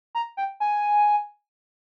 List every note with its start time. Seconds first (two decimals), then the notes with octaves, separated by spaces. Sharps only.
0.15 A#5
0.37 G5
0.60 G#5